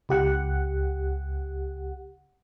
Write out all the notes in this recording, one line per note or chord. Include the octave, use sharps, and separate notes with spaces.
C#2 G4 F#5